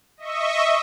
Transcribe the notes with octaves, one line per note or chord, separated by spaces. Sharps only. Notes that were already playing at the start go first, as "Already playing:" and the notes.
D#5 E5 C#6